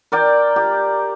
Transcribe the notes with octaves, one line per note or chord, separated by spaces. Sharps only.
A#4 D5 G5
G4